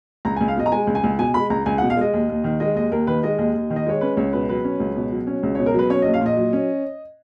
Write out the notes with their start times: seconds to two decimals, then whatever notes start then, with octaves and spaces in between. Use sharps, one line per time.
0.25 C#2 A#5
0.36 G#5
0.41 C#2
0.48 F5
0.56 B2 D#5
0.66 A#5
0.72 G#3 G#5
0.87 C#2
0.95 G#5
1.04 C#2
1.19 B2 G#5
1.34 G#3 B5
1.50 C#2 A#5
1.66 C#2 G#5
1.78 F#5
1.82 B2
1.90 F5
1.97 G#3 D#5
2.13 D#2
2.29 D#2
2.44 D#3
2.60 G#3 D#5
2.75 D#2 D#5
2.92 D#2 A#4
3.07 D#3 B4
3.23 G#3 D#5
3.38 D#2 D#5
3.55 D#2
3.70 D#3
3.76 D#5
3.86 G#3 C#5
4.01 C#4 B4
4.17 C#2 C#5
4.33 B2 B4
4.49 F#3 B4
4.64 C#4
4.80 C#2
4.96 B2
5.12 F#3
5.27 C#4
5.43 C#2
5.55 C#5
5.59 B2
5.66 A#4
5.74 F#3 B4
5.90 C#4 C#5
6.02 D#5
6.05 A#1
6.14 F5
6.21 A#2 D#5
6.37 F#3
6.53 C#4